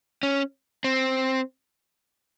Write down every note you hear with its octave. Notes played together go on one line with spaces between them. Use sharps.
C#4
C4